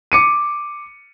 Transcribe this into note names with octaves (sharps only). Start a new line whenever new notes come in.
D6 C#7 D#7